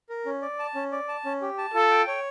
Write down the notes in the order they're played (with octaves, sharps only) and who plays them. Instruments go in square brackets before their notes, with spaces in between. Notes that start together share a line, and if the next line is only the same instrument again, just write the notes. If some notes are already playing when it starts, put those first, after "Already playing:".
[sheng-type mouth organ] A#4
C#4
D5
A5
C#4
D5
A5
C#4
G4
A5
[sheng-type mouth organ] F4 [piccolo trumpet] A4
[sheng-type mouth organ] G5
C#5